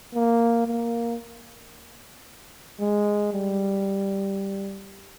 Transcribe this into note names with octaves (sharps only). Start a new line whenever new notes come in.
A#3
A#3
G#3
G3